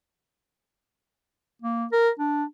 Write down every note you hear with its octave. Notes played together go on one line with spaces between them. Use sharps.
A#3
A#4
D4